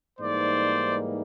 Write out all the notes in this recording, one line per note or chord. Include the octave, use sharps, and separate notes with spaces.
G#2 E3 G3 A#3 D#4 C5 D5